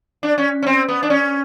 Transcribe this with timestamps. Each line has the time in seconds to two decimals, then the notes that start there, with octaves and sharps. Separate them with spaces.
0.23 D4
0.38 C#4
0.63 C#4
0.67 C4
0.88 B3
1.03 D4
1.10 C#4